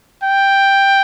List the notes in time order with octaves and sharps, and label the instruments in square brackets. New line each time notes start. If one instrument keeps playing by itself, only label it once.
[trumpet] G5